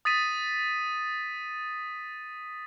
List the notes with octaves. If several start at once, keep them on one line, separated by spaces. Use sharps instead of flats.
D#6 A6 B6 D#7